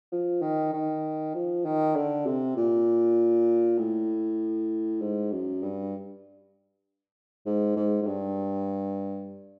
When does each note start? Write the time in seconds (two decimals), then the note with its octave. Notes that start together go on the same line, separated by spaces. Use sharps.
0.12 F3
0.42 D#3
0.73 D#3
1.35 F3
1.65 D#3
1.96 D3
2.26 C3
2.57 A#2
3.78 A2
5.02 G#2
5.31 F#2
5.63 G2
7.46 G#2
7.76 G#2
8.02 G#2
8.06 G2